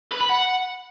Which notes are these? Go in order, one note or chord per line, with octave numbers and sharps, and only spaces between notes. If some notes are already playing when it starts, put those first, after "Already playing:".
B4
B5
F#5